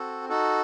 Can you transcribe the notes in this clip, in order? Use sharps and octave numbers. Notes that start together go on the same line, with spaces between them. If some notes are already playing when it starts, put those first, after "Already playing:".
Already playing: C4 F#4 A4
D#4 F#4 A4